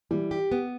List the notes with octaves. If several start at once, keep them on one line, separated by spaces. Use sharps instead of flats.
E3 G3
G4
B3